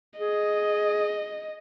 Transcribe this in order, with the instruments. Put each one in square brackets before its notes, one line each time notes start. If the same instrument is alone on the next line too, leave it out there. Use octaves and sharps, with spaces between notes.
[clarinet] G#4 [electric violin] D#5